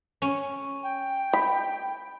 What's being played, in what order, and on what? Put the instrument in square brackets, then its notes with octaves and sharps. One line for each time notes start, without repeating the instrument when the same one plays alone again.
[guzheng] C#4
[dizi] G5
[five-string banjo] B5